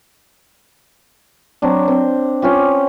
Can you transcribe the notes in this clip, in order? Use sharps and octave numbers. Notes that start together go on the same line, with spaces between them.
F#3 C4 D4
C4
C#4 F4 G4